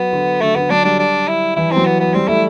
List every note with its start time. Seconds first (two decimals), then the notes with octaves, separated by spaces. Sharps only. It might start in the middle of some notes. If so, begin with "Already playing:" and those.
Already playing: F#3 B3
0.13 D3
0.41 D3 A3
0.55 D3 B3
0.70 F#3 D4
0.84 G3 D4
0.99 D4
1.28 E4
1.56 E3 E4
1.71 F#3 C4
1.86 B3
2.00 B3
2.14 G3 C4
2.28 A3 E4